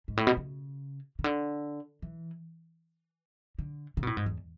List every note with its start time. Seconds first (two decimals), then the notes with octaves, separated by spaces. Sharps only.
0.08 G#2
0.17 A2
0.27 B2
0.37 C#3
1.19 C#3
1.24 D3
2.02 E3
3.59 D3
3.97 C#3
4.03 B2
4.07 A2
4.17 G#2
4.26 E2